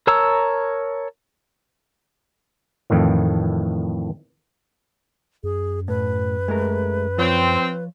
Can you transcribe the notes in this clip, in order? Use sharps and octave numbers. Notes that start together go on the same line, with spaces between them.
A#4 C#5 A5 A#5 E6
F2 A2 D#3 E3
F#2 G#4
A2 B4
G#3 A3 A#4
F3 C4 F4 C#5